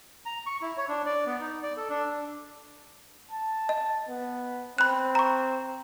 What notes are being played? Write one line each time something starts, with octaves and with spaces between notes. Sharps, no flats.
A#5
C#6
E4
C#5
D4
D5
B3
D#4
D5
A4
D4
D4
A5
D#5
B3
C4 B5 F#6
A#5 C#6